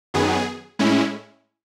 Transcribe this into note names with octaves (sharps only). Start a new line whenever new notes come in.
F#2 D#3 F#3 B3 G#4
A2 G#3 C#4 E4